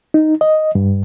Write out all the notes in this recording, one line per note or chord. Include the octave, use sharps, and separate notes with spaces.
D#4
D#5
G2